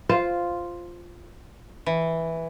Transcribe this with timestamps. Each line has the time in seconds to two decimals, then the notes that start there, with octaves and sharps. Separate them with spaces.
0.09 F4 C5 F5
1.86 E3